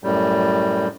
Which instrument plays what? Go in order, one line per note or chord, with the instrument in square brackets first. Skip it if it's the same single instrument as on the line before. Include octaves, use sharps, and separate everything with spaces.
[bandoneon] F#2 A2 G3